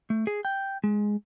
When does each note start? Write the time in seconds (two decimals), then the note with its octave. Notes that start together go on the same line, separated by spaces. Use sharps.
0.10 A3
0.27 G#4
0.45 G5
0.84 G#3